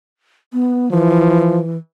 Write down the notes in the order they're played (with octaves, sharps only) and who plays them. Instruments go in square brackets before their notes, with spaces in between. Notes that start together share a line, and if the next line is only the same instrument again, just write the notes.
[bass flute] B3
[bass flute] E3 [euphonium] F3